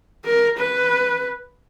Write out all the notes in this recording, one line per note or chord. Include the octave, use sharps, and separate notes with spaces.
A#4
B4